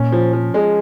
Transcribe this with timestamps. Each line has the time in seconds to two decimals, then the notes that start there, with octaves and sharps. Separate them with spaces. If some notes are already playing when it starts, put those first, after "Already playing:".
Already playing: A#2 C#4
0.12 F3
0.33 F3
0.54 G#3